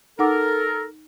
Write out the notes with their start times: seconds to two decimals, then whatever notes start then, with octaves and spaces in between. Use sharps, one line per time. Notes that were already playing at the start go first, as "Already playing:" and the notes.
0.19 D#4 A4 A#4 F#5 D6